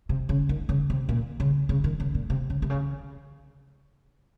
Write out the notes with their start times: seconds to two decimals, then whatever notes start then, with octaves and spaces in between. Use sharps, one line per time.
0.09 C3
0.29 C#3
0.49 D#3
0.69 C#3
0.90 C3
1.09 A#2
1.40 C#3
1.69 C#3
1.84 D#3
2.00 C#3
2.15 A#2
2.30 C3
2.50 C#3
2.62 C3
2.70 C#3